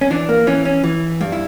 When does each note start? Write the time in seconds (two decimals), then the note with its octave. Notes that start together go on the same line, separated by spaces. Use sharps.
0.01 C#4
0.10 E3 D4
0.29 A#3
0.47 E3 C#4
0.65 C#4
0.84 E3
1.21 G2
1.32 E4